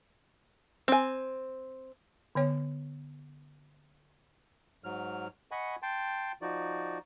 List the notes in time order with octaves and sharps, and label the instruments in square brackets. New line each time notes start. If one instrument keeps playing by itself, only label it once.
[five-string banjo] C4 G#5
[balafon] D3 B3 C#5
[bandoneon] G#2 F#3 F6
D#5 F#5 G#5 B5 C#6
G5 A5 C6
F3 D#4 F#4 D5